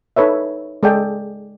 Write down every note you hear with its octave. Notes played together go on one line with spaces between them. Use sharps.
D#4 A4 B4 C#5 E5
G#3 G#4 A4 D5 D#5 G5